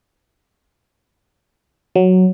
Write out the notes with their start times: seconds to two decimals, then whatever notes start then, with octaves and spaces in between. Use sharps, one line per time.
1.96 F#3